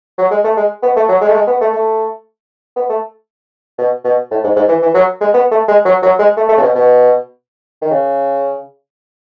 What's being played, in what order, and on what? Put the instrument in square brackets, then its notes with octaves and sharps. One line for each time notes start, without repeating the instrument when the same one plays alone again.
[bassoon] F#3
G#3
A3
G#3
B3
A3
F#3
G#3
A3
G#3
B3
A3
A3
B3
A3
B2
B2
A2
G#2
G#2
E3
E3
F#3
G#3
B3
A3
G#3
F#3
F#3
G#3
A3
A3
C#3
B2
B2
D#3
C#3